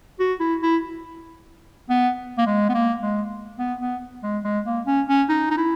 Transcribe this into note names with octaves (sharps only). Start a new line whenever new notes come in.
F#4
E4
E4
B3
A#3
G#3
B3
A#3
G#3
B3
B3
G#3
G#3
A#3
C#4
C#4
D#4
D#4
E4